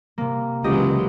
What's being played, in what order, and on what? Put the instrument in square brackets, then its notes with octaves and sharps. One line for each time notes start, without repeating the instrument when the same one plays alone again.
[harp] C3 A#3
[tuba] C#2 [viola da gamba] E3 F#3 G#3 [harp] G4 D#5